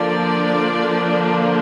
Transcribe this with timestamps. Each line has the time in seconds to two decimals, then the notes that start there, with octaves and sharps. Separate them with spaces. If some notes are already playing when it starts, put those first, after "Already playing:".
Already playing: D3 F3 A#3 D4 D5